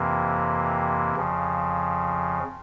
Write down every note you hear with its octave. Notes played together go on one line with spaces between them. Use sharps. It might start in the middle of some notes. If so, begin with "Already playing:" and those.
Already playing: F2 C3 E3 A#3
F2 C#3 F3